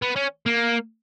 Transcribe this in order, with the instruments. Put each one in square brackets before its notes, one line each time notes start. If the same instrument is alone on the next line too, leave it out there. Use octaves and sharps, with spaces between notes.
[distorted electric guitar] B3
C#4
A#3